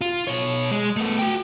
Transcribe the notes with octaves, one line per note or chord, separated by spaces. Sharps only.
F4
B2 C#5
G#3
A3 B3
F#4 G5